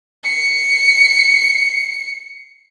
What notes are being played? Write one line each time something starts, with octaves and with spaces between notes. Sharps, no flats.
C7 C#7